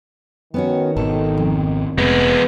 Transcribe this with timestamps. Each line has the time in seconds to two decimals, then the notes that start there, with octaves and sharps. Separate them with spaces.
0.54 D#3 B3 C#4 F#4
0.97 G#1 B2 A4
1.38 F2
1.98 F1 G#3 B3